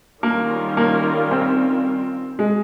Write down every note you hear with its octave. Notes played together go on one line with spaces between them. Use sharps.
D#3 G3 A#3 C#4 F4 A#4
A#3
C4
G#3